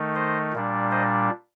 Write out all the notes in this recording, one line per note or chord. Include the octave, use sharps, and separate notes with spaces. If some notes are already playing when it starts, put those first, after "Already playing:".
Already playing: D#3 A3 D#4
C5 D#5
A#2 G3 D4
C5 D#5